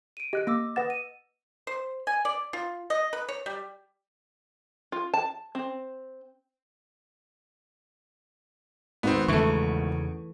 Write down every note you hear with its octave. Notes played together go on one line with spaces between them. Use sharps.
D7 D#7
G4 D#5 F#6 D7
A#3 D6 E6 A#6
B4 F#5 D#6 A6 A#6 E7
D#7
C5
G#5
D5
F4
D#5
B4
C#5
G3
F4
A5
C4
G#1 G#2 B3 C4
E2 C#3 E3 A3 C#6